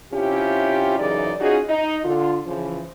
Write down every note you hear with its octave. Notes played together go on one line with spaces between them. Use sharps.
C3 C#4 E4 F4 G4
F#2 C#3 E3 D#4 G#4 D5
C#4 D#4 F4 F#4 G#4
D#4
D3 F4
C#3 E3 F3